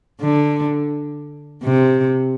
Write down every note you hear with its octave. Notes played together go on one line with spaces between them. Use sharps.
D3
C3